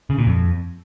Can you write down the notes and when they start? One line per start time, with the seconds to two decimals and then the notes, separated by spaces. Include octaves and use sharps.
0.10 C#3
0.18 A#2
0.27 F2